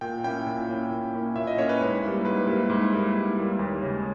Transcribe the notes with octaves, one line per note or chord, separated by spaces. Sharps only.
A#2 G5
A#3 C#4 E4 G5
A#2
A#3 C#4 E4
A#2
A#3 C#4 E4
A#2 E5
D#5
A#3 C#4 E4 C#5
B4
G#2
G3 A#3 E4
G#2 B4
G3 A#3 E4
G#2
G3 A#3 E4
G#2
G3 A#3 E4
D#2
C#3 G#3 C#4